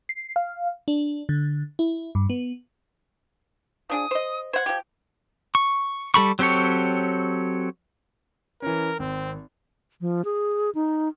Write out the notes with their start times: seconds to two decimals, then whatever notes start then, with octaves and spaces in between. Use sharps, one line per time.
0.09 C7
0.36 F5
0.88 D4
1.29 D3
1.79 E4
2.15 G2
2.30 B3
3.90 F3 D4 G#4 D#6
4.11 C5 D#5
4.53 C5 F#5 G#6
4.66 F3 G4
5.55 C#6
6.14 G3 A4 B5 C#6
6.39 F#3 C4 G4 A4 C#5
8.62 E3 C#4 A#4
8.99 G#1 C4
10.01 F3
10.25 G#4
10.75 D#4